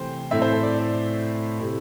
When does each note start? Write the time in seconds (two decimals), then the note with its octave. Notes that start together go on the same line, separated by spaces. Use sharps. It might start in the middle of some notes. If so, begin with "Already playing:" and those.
Already playing: C3 E3 A3 C5 G5
0.31 A2 A3 C4 E4 E5
0.42 C5
0.52 A4
0.63 D5
0.79 D5
1.59 C3 A3 E4